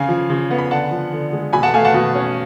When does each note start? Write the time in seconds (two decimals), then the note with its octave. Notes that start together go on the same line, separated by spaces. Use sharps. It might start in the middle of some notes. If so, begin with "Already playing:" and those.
Already playing: C#3 F5 G#5
0.08 F3
0.30 C#3
0.51 B3
0.58 B5
0.71 D3 F#5 A5
0.91 F3
1.13 D3
1.33 G#3
1.53 B2 G#5 B5
1.63 F#5 A5
1.74 A3 F5 G#5
1.85 F#5 A5
1.94 B2
2.15 C#4